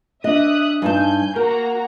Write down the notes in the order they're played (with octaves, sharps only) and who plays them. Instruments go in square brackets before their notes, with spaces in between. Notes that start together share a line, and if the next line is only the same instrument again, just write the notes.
[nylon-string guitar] D4 D#5 [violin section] E5 D#6 F#6
[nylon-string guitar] G2 D#4 A5 [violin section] G#5 G6
[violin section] A#3 F#4 A#5 [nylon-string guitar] A#4